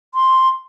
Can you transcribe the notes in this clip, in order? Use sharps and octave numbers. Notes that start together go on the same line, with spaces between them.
C6